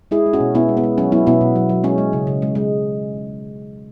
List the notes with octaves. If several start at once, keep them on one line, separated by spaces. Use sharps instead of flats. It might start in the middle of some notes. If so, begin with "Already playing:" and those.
G#3 E4 G#4
G#3
C#4 F#4
B2
B2 B3 E4
G#3
B3
G#3
F#3 C#4
F#3 B3 E4
B2 B3 E4
B2
F#3
F#3
G#3 C#4
G#3
C#3
C#3
G#3
G#3